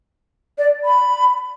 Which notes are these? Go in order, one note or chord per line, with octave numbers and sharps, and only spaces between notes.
D5
B5